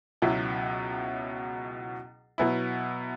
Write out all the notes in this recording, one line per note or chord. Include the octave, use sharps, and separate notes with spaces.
C#2 B2 F#3 E4
B2 F#3 B3 E4